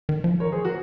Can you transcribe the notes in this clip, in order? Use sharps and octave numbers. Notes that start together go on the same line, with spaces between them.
D#3
F3
A#4 C#5
G#4 C5
F#4 A#4